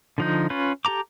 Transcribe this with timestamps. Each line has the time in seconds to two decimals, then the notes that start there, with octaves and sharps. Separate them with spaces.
0.18 D3 F3 D#4
0.50 C#4 F4 B4
0.85 G4 A4 A#5 D6